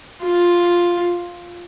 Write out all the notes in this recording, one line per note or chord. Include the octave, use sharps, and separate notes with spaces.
F4